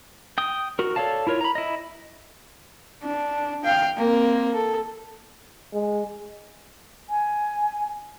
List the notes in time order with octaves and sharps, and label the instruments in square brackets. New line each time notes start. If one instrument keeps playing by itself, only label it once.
[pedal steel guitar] G5 D#6
F#4 A#4
A4 C#5 D5 F5 A5
E4 F4 A#4 C#5
A#5 B5
E4 D#5
[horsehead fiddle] D4
F5 G5
A#3 C4
A4
[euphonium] G#3
[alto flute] G#5